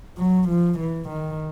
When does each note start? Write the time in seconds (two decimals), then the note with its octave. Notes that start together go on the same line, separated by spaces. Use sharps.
0.18 F#3
0.48 F3
0.79 E3
1.09 D#3